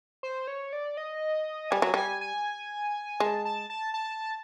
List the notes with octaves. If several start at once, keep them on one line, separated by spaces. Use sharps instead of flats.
C5
C#5
D5
D#5
G3 G#5
F#3
G3 G#5
G#5
G#3 A5
A5
A5
A5